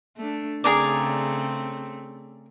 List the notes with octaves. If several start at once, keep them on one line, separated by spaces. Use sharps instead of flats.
A3 D4
C#3 A3 C4 G#4 A#4 D5